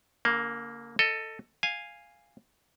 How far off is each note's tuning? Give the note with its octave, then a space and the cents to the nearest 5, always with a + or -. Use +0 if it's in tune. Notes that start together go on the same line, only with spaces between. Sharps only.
D3 -45 A#3 +0
A4 +15 D#5 +0
F5 +0 G#5 -10